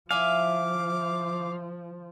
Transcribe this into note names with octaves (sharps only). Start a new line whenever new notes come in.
F3 E4 E5 F5 G#5 D6